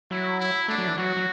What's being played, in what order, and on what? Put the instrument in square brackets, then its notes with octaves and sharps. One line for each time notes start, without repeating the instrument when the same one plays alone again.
[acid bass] F#3 [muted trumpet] E4
[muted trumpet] E4
[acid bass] A3 [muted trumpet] D4
[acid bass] F#3
E3
[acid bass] F#3 [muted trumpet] F#4
[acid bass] F#3